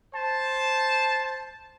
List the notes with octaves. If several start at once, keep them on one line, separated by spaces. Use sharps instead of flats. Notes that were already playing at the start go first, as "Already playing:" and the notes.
C5 A5